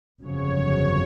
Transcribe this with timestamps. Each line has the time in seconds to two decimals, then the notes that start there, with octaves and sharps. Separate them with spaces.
0.21 G1 F2 C#3 F#3 C#5